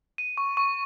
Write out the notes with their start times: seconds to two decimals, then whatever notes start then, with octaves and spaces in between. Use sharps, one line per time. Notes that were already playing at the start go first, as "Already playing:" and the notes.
0.18 D#7
0.37 C#6
0.57 C#6